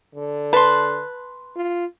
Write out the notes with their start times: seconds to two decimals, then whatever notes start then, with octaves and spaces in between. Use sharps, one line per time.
0.15 D3
0.53 B4 A5 C6
1.56 F4